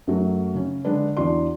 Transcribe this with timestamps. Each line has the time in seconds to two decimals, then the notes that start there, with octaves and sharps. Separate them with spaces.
0.07 F#2 F#3 A3
0.55 C#3 C#4
0.85 D3 G#3 D4 B4
1.17 E2 E3 D4 F#4 D5 C6